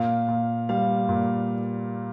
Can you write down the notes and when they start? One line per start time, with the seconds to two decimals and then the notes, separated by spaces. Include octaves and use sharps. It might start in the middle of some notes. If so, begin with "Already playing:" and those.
Already playing: A#2 F5
0.28 A#2
0.69 G3 F5
1.09 A#2